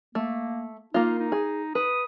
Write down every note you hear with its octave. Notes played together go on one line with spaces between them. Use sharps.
A3 A#3
A#3 D#4 F4
D#4
G#4
B4 D#6